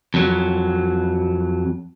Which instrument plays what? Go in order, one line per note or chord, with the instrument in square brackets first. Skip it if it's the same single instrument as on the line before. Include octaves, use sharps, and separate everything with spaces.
[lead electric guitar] F2 F#3